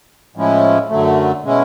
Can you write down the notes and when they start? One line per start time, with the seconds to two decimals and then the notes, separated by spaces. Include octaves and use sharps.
0.36 A2 F3 G#3 C#4 E4
0.89 F#2 D3 F#3 A3
1.43 B2 G#3 C#4 E4